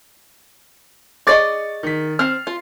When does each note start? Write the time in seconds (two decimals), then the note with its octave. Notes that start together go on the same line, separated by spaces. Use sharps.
1.27 G#4 D5 D#5 C#6 D6 A6
1.83 D#3 B6
2.19 C4 F6 C7
2.47 F4